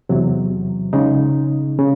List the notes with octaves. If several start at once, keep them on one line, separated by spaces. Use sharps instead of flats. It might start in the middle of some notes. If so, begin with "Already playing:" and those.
E2 C3 F#3
C#3 G#3 D#4
C#3